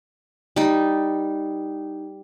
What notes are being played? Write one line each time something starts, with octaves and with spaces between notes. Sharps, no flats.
G3 D#4